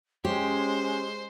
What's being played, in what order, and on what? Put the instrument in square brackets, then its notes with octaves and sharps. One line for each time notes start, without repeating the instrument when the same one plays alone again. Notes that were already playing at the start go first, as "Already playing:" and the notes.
[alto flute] G#3 [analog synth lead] C#4 [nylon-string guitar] G4 [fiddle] C5